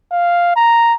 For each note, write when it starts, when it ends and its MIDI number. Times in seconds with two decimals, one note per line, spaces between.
0.12 0.54 77
0.56 0.94 82